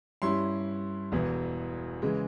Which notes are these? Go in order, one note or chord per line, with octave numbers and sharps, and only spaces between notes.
G2 G3 C#4 E4 C6
E1 E2 E3
C#3 E3 G#3